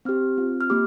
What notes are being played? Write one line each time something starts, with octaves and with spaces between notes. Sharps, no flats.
C4 G4 F6
C4 F4
F6
A#3 G4 D6